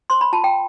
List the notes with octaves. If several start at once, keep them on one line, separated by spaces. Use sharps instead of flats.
C5 C6
B5
F4 A5
G5